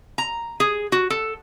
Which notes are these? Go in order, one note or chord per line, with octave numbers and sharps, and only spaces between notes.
A#5
G#4
F#4
A4